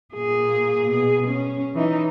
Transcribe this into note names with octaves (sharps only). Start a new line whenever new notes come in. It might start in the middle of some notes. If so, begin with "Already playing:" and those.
A#2 G#4
B2 G#4
C#4
E3 D#4